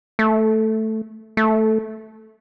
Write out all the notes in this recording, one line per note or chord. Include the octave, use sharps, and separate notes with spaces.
A3
A3